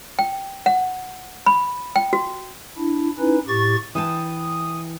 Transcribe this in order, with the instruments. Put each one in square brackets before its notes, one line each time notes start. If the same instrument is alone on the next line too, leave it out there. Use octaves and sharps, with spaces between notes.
[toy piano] G5
F#5
B5
G5
F#4
[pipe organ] D4 E4
C#4 D#4 E4 B4
A2 G4 C#6 A6
[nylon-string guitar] E3 G5 A5 [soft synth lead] D#6